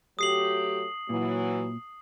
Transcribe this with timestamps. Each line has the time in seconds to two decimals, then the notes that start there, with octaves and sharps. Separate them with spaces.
0.19 F#3 A3 G4 D#6 C7 F#7
1.09 A#2 E3 F#3